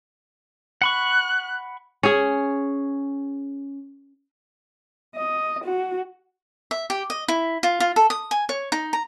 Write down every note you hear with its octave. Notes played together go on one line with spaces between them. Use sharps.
F#5 B5 C#6 F#6
C#4 G#4
D#5
F#4
E5
G4
D#5
E4
F4
F4
A4
D#6
G#5
C#5
D#4
A#5